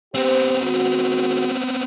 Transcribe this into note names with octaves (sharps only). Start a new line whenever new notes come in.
B3 C4 G4 C5
D#3 G#3 F#4